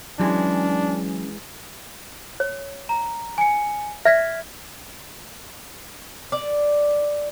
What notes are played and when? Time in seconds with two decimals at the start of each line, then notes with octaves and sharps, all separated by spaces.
0.19 E3 F#3 G#3 C#4 D4
2.40 C#5
2.89 A#5
3.38 G#5 C#7
4.05 D5 E5 F6 G#6 B6
6.32 D5